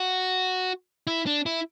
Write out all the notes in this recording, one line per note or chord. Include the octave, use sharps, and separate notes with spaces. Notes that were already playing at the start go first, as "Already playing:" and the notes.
Already playing: F#4
E4
D4
E4